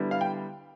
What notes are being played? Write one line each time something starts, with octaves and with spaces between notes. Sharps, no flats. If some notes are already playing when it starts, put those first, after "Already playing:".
Already playing: D3 G3 B3 E4
F5
G5